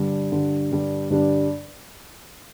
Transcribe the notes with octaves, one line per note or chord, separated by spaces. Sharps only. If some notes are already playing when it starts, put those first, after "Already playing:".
Already playing: G2 D3 G3 D4
G2 D3 G3 D4
G2 D3 G3 D4
G2 D3 G3 D4